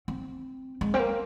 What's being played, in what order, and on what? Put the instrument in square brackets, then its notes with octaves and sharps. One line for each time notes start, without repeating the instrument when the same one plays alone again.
[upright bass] C4
G#3
C4
A#3